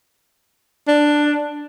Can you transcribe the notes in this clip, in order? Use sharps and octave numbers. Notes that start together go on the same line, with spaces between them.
D4